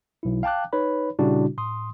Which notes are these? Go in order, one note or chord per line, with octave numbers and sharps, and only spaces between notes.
B1 E4
F5 G5 A5 D6 F#6
D#4 B4 C#5 B5
A#2 C#3 G3 D4 E4 F#4
A2 C6 D#6